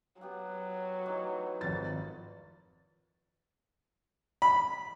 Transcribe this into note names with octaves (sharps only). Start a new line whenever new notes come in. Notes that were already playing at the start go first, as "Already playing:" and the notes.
F#3 B3 G4 F#5
E3 A3 D#4
G#1 F2 A6
B5